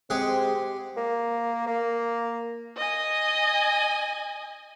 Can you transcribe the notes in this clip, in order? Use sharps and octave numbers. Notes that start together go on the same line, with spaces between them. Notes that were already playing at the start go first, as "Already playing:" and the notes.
G#3 C4 G4 G#4 F#5
A#3
A#3
D#5 G#5